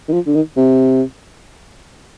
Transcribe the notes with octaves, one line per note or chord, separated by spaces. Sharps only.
D#3
F3
D3
D#3
C3